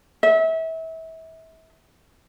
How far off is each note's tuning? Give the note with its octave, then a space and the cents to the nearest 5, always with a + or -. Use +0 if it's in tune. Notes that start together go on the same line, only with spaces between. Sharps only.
E5 -30